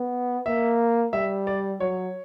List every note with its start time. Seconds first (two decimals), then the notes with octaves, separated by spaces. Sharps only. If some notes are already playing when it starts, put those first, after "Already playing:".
Already playing: B3
0.46 A#3 E5
1.13 G3 E5
1.47 D5
1.80 F#3 C#5